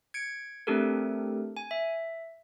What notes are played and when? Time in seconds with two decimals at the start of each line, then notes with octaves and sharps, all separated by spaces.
0.14 G#6 C#7 D7
0.67 A3 C4 D4 G4 A4 A#4
1.57 G#5
1.71 E5